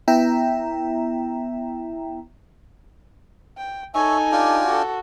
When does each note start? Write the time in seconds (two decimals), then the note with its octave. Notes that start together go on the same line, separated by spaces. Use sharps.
0.08 B3 E4 E5 G5 A#5
3.57 G5
3.94 D#4 A4 C#5 E5 G#5
4.32 D4 F4 G4
4.65 F#4 A4